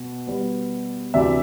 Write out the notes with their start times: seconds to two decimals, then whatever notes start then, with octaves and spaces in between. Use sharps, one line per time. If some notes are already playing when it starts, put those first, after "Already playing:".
Already playing: B2
0.27 B2 G3 B3
1.14 D2 C3 E3 D5 E5